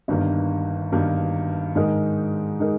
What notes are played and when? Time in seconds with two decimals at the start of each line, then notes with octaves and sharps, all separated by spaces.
0.08 G1 G2 D#3 A#3
0.92 G1 G2 D#3 A#3
1.75 G#2 D#3 G#3 D#4 A#4
2.60 D#3 G#3 D#4 A#4